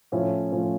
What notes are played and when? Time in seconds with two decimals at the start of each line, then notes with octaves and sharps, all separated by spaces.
0.12 A2 F3 A3 C#4 F4
0.52 A2 F3 A3 C#4 F4